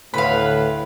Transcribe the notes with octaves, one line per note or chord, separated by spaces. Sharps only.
D2 A2 B4 F5 B5 C6 F#6